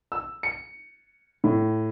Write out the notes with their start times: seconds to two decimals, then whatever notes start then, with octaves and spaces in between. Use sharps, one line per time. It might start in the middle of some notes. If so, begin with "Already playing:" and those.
0.12 E6
0.43 C#7
1.44 A2